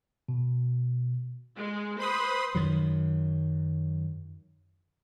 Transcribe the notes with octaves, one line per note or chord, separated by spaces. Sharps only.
B2
G#3
B4 C5 B5 C6 D#6
F#2 D#3 F#3